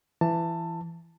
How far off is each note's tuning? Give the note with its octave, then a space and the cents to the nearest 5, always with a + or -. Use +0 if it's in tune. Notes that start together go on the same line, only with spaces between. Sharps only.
E3 +20 A5 +20